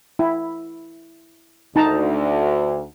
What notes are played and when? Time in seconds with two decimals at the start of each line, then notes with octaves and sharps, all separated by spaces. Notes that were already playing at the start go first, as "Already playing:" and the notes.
0.19 E4
1.76 D2 D#4 A5 A#5